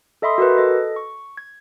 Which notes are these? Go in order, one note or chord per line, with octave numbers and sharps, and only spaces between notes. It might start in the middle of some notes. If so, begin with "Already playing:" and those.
A4 D#5 E5 B5 C6 D#6
F#4 A#4 B4
A4 D#5
C#6
G#6